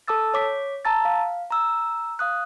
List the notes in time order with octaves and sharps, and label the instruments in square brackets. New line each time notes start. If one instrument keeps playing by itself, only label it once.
[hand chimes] A4 A5 D6 E6 A6
C#5 D6 B6
A5 A#5 E6 A6
F5
A#5 E6
F5 D#6 F#6